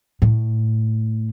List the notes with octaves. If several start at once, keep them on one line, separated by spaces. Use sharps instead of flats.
A2